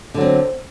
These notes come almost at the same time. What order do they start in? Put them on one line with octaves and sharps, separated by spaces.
D3 F#3 C4